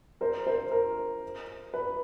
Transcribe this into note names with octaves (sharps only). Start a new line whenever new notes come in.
A#4 C5
A#4 C5
A#4
B4